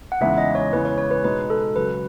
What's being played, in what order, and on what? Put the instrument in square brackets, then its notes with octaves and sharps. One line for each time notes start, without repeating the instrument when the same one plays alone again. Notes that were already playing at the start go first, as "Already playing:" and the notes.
[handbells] F#5
[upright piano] E2 C#3 E3 G#3 D#4 [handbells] E5
[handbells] D#5
C#5
[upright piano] E2 C#3 E3 G#3 [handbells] B4
[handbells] C#5
C#5
B4
[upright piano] B2 G#3 D#4 [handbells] B4
[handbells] A4
[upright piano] C#2 C#3 F#3 [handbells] B4